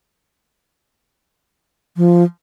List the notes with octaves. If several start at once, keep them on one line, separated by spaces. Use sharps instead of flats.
F3